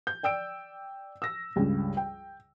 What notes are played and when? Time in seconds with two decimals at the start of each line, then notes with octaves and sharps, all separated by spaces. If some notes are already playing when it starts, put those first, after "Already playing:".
0.07 G6
0.23 D5 G5 E6 D7
1.22 E6 A#6
1.56 C#2 G2 C#3
1.97 G5